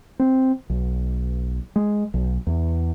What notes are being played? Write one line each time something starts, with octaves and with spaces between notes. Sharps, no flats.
C4
B1
G#3
B1
E2